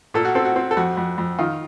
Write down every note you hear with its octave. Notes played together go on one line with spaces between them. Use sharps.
A#2 A4
F#4
C4 A4
F#4
C4
A4
F2 F#4
F2
F2
D#3 F4